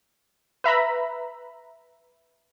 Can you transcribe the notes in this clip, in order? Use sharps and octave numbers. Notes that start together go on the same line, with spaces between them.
B4 E5 A#5 B5